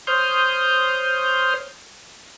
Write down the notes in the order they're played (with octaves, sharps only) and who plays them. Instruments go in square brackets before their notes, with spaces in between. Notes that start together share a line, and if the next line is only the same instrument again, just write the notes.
[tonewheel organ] C5 C#5 C6 D#6 F6 G6